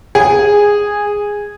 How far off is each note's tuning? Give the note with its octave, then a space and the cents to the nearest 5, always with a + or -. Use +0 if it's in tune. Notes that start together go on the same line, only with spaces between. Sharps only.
G#4 -10